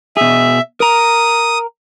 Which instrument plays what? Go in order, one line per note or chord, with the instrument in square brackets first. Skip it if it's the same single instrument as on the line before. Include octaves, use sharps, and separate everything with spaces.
[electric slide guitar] B2 G#4 [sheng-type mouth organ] E5
[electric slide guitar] A#4 A#5 [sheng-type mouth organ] D#6